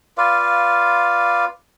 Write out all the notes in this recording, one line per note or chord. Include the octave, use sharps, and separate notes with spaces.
F4 B4 D5 F5